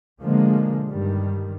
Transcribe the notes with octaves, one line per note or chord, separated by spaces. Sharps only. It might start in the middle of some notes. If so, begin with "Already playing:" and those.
B2 D3 F3 G#3 A#3
G2 D#3 G3